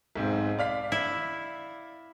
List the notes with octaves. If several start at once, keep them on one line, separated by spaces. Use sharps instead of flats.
B1 G#2 C4
D5 F5 B6
E4